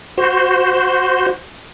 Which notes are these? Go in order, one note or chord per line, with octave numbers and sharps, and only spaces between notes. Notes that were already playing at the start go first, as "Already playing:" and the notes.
F#4 C5